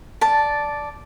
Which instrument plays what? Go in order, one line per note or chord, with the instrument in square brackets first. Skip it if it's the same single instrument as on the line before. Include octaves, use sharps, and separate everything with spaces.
[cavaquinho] D5 A5